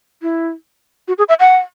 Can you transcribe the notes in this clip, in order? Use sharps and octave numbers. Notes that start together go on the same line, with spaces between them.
E4
F#4
G#4
E5
F#5